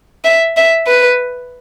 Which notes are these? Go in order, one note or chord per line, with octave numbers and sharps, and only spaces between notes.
E5
E5
B4